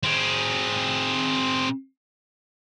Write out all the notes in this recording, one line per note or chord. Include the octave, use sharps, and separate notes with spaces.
C4 G#4